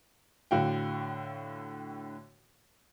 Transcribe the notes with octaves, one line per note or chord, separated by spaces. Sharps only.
A2 D3 F#4 F5 G5